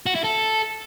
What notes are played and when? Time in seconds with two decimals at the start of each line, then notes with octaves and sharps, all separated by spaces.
0.06 F#4
0.15 E4
0.24 A4